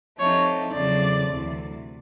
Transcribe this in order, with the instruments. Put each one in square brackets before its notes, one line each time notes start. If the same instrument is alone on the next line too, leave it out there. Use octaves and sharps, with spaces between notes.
[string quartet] F3 A3 C4 D#4 G4 [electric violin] C#5
[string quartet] E2 C#3 F#3 A3 C4 [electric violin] D5
[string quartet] D2 C3 E3